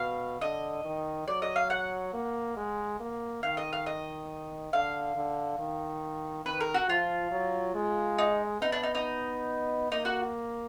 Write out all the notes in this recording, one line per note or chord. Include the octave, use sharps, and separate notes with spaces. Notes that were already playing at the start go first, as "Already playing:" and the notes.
Already playing: B2 F5
D3 D#5
D#3
F#3 D5
D#5
F5
F#5
A#3
G#3
A#3
D#3 F5
D#5
F5
D#5
D3 F5
D3
D#3
D#3 B4
A#4
F#4
F3 F4
F#3
G#3
D#4
B3 D#4
D4
D#4
D#4
A#3 D#4
F#4